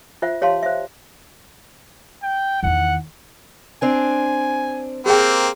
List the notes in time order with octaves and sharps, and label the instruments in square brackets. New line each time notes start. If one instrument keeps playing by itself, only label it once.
[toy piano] F4 C5 E5 F#5
G4 C#5 F5 A5 C6
C5 E5
[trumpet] G5
[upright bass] E2 D#3 [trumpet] F#5
[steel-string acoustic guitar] C4 D4 [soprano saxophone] G#5
[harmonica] A#3 C4 [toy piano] G4 G#4 G5